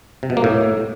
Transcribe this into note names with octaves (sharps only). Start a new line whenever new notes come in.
C3
B2
A#3
A2